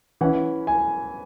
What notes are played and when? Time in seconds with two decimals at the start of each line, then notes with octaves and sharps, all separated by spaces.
0.21 E3 C#4 F#5
0.67 G#5